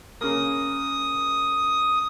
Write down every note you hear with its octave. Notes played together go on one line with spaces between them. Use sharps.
C#3 A#3 D#6